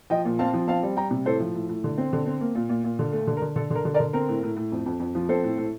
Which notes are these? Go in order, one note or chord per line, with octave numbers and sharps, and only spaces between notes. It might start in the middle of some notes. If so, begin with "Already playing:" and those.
F3 D#5 G5
A#2
C4 F5 A5
F3
C4 F5 A5
G3
G3 G5 A#5
C3
A2 A4 C5
F3
A2
A2
D3
C4
D3
C4
A#3
A#2
A#2
A#2
D3
A3
D3
A#4
D3
D3 A4
D3 A#4
D3
A#4 D5
D3
C4 A#4
A2
A2
A2
F2
F2
F2
F3
C4 A4 C5
A2
A2